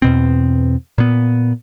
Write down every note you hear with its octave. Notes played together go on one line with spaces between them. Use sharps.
E2 B2 C4
A#2 B3